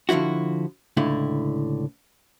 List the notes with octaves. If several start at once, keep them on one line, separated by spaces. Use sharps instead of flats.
D3 F3 F#3 E4 F#4
C#2 A2 D3 E4